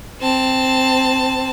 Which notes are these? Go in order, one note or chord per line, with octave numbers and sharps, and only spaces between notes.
C4 A5